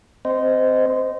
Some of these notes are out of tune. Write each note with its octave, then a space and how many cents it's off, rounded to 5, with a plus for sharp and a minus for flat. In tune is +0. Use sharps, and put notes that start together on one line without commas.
C4 +0 C5 -20 D#5 +0